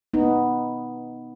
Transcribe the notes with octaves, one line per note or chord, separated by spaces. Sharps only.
B3 D#4